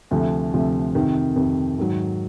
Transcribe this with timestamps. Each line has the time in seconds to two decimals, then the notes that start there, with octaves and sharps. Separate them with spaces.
0.11 D2 C3 F3 A3
0.53 D2 C3 F3 A3
0.94 F2 C3 D#3
1.36 F2 C3 D#3
1.78 G#2 D#3 F#3